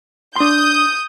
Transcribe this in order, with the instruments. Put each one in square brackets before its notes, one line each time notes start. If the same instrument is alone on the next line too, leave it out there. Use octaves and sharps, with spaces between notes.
[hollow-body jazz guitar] D4 C6 [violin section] D#6 G6